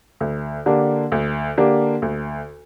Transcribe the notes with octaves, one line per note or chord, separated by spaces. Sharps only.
D2
D3 A#3 D4 G4
D2
D3 A#3 D4 G4
D2